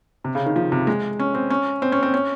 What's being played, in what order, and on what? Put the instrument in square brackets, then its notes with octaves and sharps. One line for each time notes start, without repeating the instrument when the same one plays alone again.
[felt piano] C3
C#3
D#3
F3
C3
G#3
C#4
C4
C#4
C4
C#4
C4
C#4